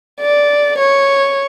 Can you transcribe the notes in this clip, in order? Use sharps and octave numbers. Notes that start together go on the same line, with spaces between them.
D5
C#5